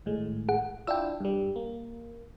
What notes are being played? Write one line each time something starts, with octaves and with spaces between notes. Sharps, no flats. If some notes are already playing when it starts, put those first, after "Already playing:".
G#1 A2 G#3
G#4 F#5
D4 E4 F4 G5 E6
G2 G3
A#3